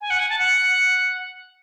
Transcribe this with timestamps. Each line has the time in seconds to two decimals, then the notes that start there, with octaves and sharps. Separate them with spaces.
0.01 G#5
0.10 F#5
0.19 G#5
0.30 A5
0.38 F#5